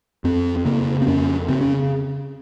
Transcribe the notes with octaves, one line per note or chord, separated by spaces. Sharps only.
F2 C4
C#3 A#3
C4
F2 C#4
C#3 C4
C#4